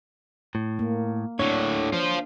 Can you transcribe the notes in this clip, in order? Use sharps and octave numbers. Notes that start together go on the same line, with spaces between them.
A2
A#3
A2 D3 D4 C#5
F4 C5